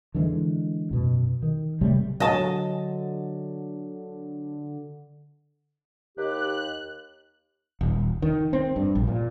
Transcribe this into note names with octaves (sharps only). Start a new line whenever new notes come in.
D3 E3 G3 G#3
F#2 B2
D#3
C3 F#3 G3 A3
D3 F#3 D#5 A5
D#2 G4 F#6
D#1
D#3
C4
G2
A#1
A#2